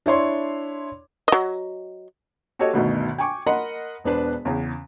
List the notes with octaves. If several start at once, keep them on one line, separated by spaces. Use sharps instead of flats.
D4 E4 C#5 C6
F#3 D#5
F#4 G4 A4 C#5 D#5
G1 D2 B2 D#3
G5 G#5 C#6 D6
A#4 D#5 F#5 B5 C6
E1 B3 D4 B4 C5
E2 C#3